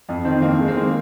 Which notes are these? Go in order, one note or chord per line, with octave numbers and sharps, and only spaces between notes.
F2
D#3 C4
F2 A#3
D#3 G#3
C4
A#3